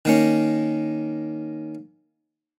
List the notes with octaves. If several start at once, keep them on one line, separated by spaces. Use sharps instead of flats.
D#3 A#3 C#4